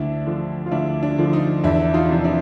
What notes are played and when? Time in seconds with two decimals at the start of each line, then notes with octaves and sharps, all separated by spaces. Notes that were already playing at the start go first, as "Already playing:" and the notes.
Already playing: D2 D4 E4
0.27 D3 F3
0.66 F4
0.72 D2 D4 E4
1.03 D4
1.18 D3 F3
1.33 D#4
1.64 E2 D4 E4
1.94 D#4 F4
2.09 C3 F3
2.24 D4 E4